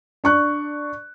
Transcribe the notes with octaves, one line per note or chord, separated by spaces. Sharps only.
D4 C#6 F#6